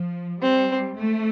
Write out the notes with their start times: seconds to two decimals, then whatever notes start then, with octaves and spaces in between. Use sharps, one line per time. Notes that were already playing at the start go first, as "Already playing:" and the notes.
Already playing: F3
0.42 G3 C4
0.96 A3